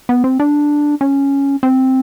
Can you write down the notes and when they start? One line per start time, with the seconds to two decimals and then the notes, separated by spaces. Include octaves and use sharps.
0.09 B3
0.24 C4
0.40 D4
1.01 C#4
1.63 C4